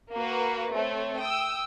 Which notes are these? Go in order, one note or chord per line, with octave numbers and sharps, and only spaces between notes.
A#3 F#4 A#4 B4
A3 C4 C#5
G5 D#6 E6